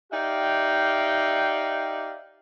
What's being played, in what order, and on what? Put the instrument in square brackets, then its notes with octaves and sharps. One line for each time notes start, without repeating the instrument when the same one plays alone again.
[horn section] D#4 G4 D5 E5 F5 G5